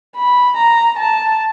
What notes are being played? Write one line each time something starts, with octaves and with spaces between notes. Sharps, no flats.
B5
A#5
A5